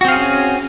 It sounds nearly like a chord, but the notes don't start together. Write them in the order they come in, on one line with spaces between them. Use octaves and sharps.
F#4 C4 F5 G#4 C#4